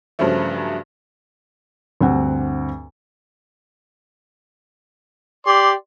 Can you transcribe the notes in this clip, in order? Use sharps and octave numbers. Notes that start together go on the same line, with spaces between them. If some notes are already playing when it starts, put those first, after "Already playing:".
G2 C#3 F3 F#3 A3
D2 G2 C4 F#5
G4 D5 C6